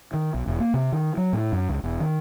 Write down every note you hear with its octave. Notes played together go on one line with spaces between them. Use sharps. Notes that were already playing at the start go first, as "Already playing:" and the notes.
D#3
B1
E1
A#3
C3
D#3
F#3
A2
F#2
C#2
E1
D#3